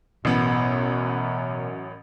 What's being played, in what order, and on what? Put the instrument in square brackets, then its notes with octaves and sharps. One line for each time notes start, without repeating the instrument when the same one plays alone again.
[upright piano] A1 B3 B5 [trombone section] F#2 [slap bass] B2